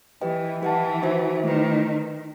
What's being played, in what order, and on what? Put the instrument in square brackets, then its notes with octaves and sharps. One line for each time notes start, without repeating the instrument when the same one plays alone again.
[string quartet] E3 [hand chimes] G4 B4 D#5 G5
[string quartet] E3 [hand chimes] G4 B4 F#5 A5
[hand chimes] D#4 F#4 C5 E5
[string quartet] D#3 [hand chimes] A3 E4 B4